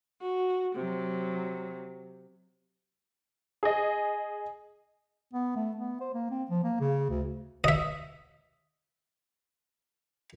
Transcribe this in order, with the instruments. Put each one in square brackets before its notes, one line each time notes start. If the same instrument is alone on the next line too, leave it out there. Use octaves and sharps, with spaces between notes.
[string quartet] F#4
C3 F#3
[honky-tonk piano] G#4 D#5
[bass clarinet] B3
A3
B3
C5
A#3
C4
F3
A#3
C#3
D2
[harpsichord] D#5 E5